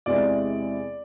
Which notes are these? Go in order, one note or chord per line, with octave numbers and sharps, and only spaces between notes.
E2 C3 E3 G#3 D5